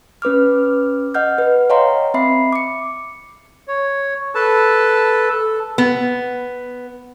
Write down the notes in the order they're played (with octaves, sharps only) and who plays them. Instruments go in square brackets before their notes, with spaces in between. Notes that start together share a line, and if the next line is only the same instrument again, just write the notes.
[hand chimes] C#4 B4 D6 F6
D#5 F#5 F6 G6
B4 F#5
C#5 D#5 F5 G5 A#5 C6
C4 E5 B5 C7
D6 C#7
[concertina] C#5
A4 B4 A5
A4
[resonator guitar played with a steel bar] B3